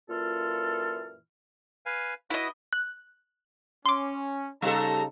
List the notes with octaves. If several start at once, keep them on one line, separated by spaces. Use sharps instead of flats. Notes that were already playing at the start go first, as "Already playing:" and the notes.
F#2 A#2 E3 F4 A4 F6
B4 F5 G#5
E4 F#4 B4 D#5
F#6
C#4 C6 D6
C#3 G3 D#4 A4 A#5